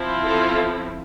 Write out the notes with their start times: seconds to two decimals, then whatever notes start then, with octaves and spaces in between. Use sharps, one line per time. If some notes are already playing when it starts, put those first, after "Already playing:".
Already playing: F3 C4 E4
0.24 F4 A4